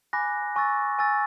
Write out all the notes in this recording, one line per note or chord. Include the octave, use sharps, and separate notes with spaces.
G#5 B5 D6 F#6 A#6
G#5 C#6 E6 A6
G#5 C#6 E6 A6